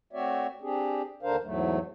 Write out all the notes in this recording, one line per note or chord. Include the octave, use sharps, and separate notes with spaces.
A3 C4 F#4 C#5 D5 E5
C4 D4 G4 G#4
D#2 D3 D4 A#4 C5 F5
E2 G#2 F#3 A3